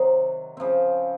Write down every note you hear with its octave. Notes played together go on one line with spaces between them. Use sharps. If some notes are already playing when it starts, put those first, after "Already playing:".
Already playing: C3 D#3 F#3
C#3 F3 C4